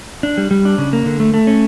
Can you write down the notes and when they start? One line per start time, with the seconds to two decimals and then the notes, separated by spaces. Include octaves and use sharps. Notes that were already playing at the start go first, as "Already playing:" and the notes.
0.23 D4
0.38 G3
0.51 G3
0.65 D4
0.78 C#3
0.93 A#3
1.06 D3
1.20 A3
1.34 A3
1.47 C#4